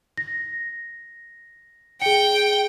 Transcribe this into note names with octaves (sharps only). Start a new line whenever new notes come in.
A#6
G#4 G5 C#7